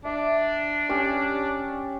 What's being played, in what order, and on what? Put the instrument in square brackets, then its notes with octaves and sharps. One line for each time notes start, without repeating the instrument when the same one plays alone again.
[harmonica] D4 [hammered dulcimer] E5
[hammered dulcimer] C#4 G4 C#5